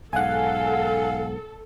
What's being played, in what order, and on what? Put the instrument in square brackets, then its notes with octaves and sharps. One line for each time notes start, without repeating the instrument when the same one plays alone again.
[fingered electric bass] B1 G#2 [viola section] A4 [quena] F5 [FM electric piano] F#5 G#5